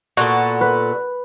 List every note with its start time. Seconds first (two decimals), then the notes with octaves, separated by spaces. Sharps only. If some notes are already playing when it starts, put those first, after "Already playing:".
0.17 A#2 B3 F#4 A4
0.61 B4